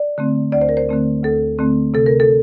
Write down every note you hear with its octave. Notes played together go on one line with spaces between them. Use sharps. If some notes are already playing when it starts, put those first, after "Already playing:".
Already playing: D5
D3 A3 C4
D2 D5
C5
A#4
C5
D3 A3 C4
D2 A4
D3 A3 C4
C3 A4
A#4
A4